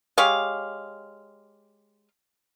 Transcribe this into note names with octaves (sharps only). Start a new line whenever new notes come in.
G#3 G4 C#5 F5